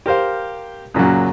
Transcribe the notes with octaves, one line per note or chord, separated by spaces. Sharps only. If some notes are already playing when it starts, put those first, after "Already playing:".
G4 A#4 C5 F5
F#2 A#2 C#3 F#3